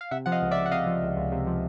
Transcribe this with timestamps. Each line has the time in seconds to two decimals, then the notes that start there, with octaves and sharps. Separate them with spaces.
0.01 F5
0.11 C3 E5 F#5
0.26 F3 F#5
0.32 D#5 F5
0.42 C#2
0.51 D5 E5
0.57 C#2
0.66 F#5
0.71 C3 D#5 F5
0.87 F3
1.02 C#2
1.17 C#2
1.32 C3
1.47 F3